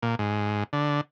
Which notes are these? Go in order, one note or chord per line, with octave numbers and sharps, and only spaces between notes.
A#2
G#2
D3